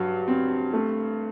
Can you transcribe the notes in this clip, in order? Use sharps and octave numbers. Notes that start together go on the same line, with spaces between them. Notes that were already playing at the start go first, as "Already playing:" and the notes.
Already playing: G2 F#3
C4
A3